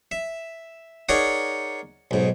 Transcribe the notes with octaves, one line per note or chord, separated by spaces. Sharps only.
E5
D#4 G#4 A#4 C#5 D5 F#5
B1 G#2